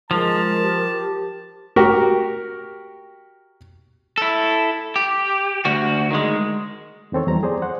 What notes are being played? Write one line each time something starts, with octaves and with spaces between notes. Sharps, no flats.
F3 G#3 A#4 A5
G4
F#4 G4 A#4
E4 A4
G4
D2 F#4
D#3 G#3
E2 D#3 C4 A4 C#5
E2 F3 G3 A#5
G#4 C5 D5
C5 F#5